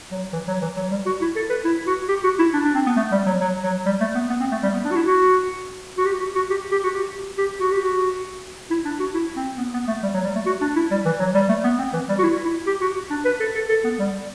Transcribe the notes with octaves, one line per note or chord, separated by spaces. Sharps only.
F#3
E3
F#3
E3
F#3
G3
F#4
E4
A4
B4
E4
F#4
G4
F#4
E4
D4
D4
C4
B3
A3
G3
F#3
F#3
F#3
G3
A3
B3
B3
C4
A3
G3
B3
D4
F#4
E4
F#4
F#4
G4
F#4
F#4
G4
G4
F#4
G4
G4
F#4
G4
F#4
E4
D4
F#4
E4
C4
B3
B3
A3
G3
F#3
G3
A3
F#4
D4
E4
G3
E3
F#3
G3
A3
B3
C4
E3
G3
F#4
E4
E4
G4
F#4
D4
B4
A4
A4
A4
B3
G3